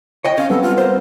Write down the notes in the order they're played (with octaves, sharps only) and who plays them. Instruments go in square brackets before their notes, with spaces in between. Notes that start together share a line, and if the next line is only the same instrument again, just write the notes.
[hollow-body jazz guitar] C#5 D#5 G5
[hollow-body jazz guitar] C#4 [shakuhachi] F5
[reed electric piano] G3 C4 [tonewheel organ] B3 [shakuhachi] A4
[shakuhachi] F4
[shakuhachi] A#4 [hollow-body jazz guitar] C5